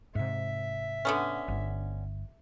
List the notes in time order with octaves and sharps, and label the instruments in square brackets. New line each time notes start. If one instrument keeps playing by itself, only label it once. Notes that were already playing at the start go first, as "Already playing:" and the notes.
[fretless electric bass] G#2 C3 [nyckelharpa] E5
[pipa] D3 B3 C#4
[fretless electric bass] G1